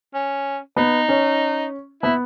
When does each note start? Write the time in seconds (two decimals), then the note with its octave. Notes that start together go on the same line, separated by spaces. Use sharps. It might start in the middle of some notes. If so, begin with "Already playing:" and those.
0.14 C#4
0.76 B3 D#4
1.09 C#4
2.03 B3 E4